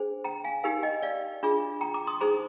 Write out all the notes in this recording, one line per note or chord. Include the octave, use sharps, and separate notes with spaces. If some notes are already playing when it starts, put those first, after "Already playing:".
Already playing: D4 G#4 C5
G5 A#5
F5 G#5
D#4 G4 A#4 F5 G#5
D#5 G5
D5 F5
D4 F4 G#4
G5 A#5
A#5 D6
C6 D#6
D#4 G#4 C5 A#5 D6